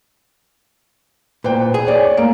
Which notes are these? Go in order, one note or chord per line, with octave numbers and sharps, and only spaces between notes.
A#2 B4 C5 G5
G#4
C#5 D5
A#3 D7